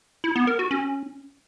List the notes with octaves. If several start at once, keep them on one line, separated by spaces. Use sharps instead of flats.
E4
B3
A#4
F#4
C#4